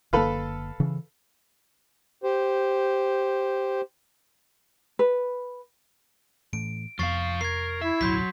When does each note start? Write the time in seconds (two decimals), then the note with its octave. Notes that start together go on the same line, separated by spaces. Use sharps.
0.13 F#1 D3 A#3 A4 B4 F5
0.80 C#3 E3
2.24 G4 C5
4.99 B4
6.53 A2 E3 A3 D7
6.99 F1 F2 F3 B3 F5 C#6 A6 C7
7.41 A#4 G#6 C7
7.81 E4 E5
8.01 D1 B1 F#2 F#3 C6 G6 B6